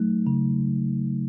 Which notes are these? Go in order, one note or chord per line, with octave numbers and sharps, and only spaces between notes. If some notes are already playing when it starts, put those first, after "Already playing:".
Already playing: F#3 A3 D#4
C#3